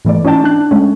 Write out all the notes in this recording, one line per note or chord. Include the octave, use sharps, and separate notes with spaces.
G#2 E3 A3 D5
C#4 D#4 E4 D5 G5 A5
D4 F#6
G#3 A3 C#4